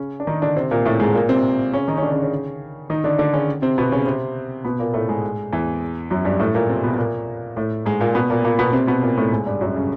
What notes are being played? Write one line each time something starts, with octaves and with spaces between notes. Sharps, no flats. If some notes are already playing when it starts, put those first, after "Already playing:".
Already playing: C#3 C#4
D4
D#3 D#4
D3 D4
C3 C4
A#2 A#3
A2 A3
G#2 G#3
A#2 A#3
C3 C4
C#3 C#4
D#3 D#4
C#4
D3 D4
C#3 C#4
C#3 C#4
D#3 D#4
D3 D4
D3 D4
C#3 C#4
C3 C4
B2 B3
C#3 C#4
C3 C4
B2 B3
A#2 A#3
A2 A3
G#2 G#3
E2 E3
F#2 F#3
G2 G3
A2 A3
A#2 A#3
C3 C4
B2 B3
B3
A#2 A#3
A2 A3
G#2 G#3
A#2 A#3
B2 B3
A#2 A#3
A#2 A#3
B2 B3
C3 C4
B2 B3
A#2 A#3
A2 A3
G#2 G#3
G2 G3
F#2 F#3
C#3